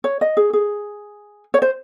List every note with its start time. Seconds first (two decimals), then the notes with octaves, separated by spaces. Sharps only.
0.04 C#5
0.21 D#5
0.37 G#4
0.53 G#4
1.54 C#5
1.62 C5